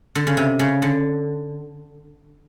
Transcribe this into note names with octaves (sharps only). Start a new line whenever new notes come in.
D3
C#3
C3
C#3
D3